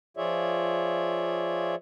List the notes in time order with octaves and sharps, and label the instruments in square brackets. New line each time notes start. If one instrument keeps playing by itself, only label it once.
[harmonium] F3 F4 G#4 C#5 D5 E5